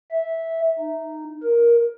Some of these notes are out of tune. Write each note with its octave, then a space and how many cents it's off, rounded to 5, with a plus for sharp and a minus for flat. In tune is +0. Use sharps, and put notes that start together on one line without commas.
E5 -10
D#4 -10
A#4 +15